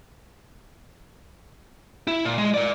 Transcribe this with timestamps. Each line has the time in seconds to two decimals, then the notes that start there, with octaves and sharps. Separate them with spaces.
2.07 E4
2.24 A#2
2.38 G#3
2.54 A#4 D5